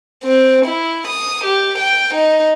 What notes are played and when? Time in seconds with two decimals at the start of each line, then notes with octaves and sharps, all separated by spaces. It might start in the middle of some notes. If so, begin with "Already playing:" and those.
0.24 C4
0.65 E4
1.07 D#6
1.44 G4
1.78 G5
2.14 D#4